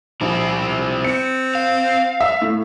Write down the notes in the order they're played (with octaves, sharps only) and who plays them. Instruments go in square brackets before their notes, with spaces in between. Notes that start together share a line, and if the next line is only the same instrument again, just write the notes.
[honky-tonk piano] A#1 [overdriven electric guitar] C4 E4
[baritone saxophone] C4 [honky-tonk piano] C#7
[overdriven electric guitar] F5
[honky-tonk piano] E5
A2